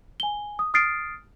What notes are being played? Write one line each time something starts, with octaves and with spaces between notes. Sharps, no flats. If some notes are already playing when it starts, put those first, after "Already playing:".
G#5 G7
D#6
D#6 F6 A6 C7 D7